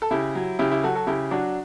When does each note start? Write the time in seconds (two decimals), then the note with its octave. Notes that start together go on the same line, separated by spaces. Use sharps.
0.02 A4
0.11 C#3 E4 G4
0.35 F#3
0.59 C#3 E4 G4
0.71 E4 G4
0.83 F#3 F#4 A4
0.95 F#4 A4
1.07 C#3 E4 G4
1.31 F#3 D4 F#4